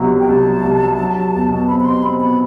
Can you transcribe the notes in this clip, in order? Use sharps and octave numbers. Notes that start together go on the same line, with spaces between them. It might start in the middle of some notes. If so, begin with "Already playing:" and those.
Already playing: C2 B2 F#3
F#3
G5
C2 A5
F#3
C2
F#3
F#3
F#3
E2
B2
C4 B5
B5
B2 C6
C4 B5
B2 B5